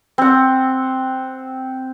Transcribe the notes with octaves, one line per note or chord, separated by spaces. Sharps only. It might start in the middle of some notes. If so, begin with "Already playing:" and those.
C4 F#5